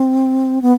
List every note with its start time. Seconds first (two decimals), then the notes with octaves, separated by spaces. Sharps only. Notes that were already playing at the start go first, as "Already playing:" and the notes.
Already playing: C4
0.62 B3